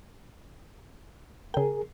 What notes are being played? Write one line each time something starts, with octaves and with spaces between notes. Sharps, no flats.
C#3 G#4 A#4 G5